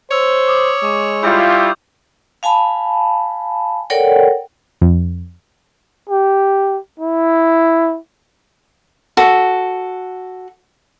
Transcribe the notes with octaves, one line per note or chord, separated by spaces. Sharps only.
C5 C#5 E6 F7
D6 D#6
G#3 C#6 D6
G3 E4 F4 G6
F5 G#5 A5 B5
A4 A#4 C#5 D5 F#5 G5
F2
G4
E4
F#4 A4